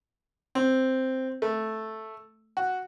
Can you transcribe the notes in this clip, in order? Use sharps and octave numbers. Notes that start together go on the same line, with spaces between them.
C4
A3
F#4